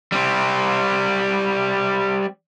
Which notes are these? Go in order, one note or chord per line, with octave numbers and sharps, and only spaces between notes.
G3 C4